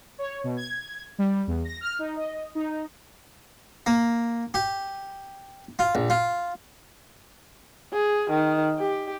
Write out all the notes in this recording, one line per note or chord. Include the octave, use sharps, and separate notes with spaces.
C#5
B2
G#6
G3
E2
A#6
F6
D#4
D#5
D#4
A#3
G4
F4
A#1
F4
G#4
D#3
G4